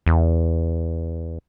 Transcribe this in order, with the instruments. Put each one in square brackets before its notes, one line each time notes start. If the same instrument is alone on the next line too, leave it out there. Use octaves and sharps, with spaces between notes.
[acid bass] E2